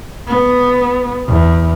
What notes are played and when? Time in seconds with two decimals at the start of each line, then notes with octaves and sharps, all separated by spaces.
0.28 B3
1.28 E2